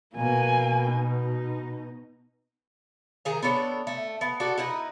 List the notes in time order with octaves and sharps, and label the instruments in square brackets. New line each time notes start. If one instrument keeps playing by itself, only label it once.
[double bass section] B2 [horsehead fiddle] A#3 G#5
[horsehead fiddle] D#4
[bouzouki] D#3 G#4 A#5
B3 D4 A4 C#5
A3
B3
F#4 A4 D5
D#4 E4 B4 D#5